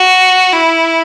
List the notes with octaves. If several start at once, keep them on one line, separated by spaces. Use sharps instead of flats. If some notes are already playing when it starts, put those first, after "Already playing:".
Already playing: F#4
E4